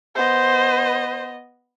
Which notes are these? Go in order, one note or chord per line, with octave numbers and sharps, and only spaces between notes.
B3 C5 D#5